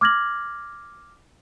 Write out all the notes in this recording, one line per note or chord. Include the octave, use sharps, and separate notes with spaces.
D6 F6 G#6 A#6 F#7